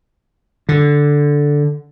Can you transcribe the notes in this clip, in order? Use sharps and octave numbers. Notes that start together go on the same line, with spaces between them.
D3